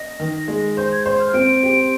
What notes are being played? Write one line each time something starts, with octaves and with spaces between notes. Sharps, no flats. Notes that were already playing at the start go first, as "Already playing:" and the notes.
Already playing: D#5 A#6
D#3
G#3
C5 G6
G#6
C5 G6
F6
C4 D7
G4